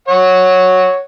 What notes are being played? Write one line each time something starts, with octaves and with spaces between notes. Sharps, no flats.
C#5 F#5